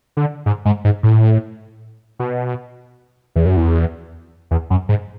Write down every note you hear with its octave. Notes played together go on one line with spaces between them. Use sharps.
D3
G#2
G#2
G#2
A2
B2
E2
F#2
E2
E2
F#2
G#2